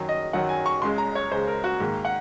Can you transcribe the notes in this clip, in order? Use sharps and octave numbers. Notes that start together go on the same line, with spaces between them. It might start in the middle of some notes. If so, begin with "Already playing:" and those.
Already playing: F#2 D#3 F#3
D#5
F#2 D#3 F#3 F#5
G#5
C#6
C#2 C#3 G#3 C6
A#5
C#5
C#2 C#3 G#3 C5
A#4
F#4
G#2 D#3 A#3
F#5